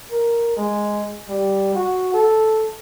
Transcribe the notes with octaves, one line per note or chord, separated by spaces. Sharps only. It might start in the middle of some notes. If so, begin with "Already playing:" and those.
A#4
G#3
G3
F#4
A4